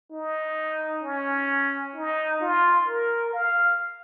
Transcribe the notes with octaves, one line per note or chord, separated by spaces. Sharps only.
D#4
C#4
D#4
F4
A#4
F5